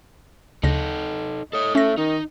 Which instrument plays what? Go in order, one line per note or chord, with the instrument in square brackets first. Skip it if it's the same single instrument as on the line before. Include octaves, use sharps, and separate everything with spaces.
[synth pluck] D2 C#3 A#6 [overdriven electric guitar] D#4 A4
[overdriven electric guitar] A4 C#5 [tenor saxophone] D#5
[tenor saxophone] A3 [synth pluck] C#4 A#6
[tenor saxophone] D#3 [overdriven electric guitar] D#4